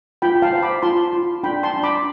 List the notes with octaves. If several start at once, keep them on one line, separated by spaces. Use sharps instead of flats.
F4 G5 B5
F5 A5
C5
B5 D6
F4 A5 C6
F4
D4 G5 B5
A5 C6
D4
B5 D6